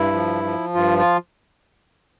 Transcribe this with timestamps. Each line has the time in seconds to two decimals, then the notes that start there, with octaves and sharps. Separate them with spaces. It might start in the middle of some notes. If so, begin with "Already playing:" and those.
Already playing: G2 E4
0.13 F3
0.44 F3
0.75 G2 F4
0.98 F4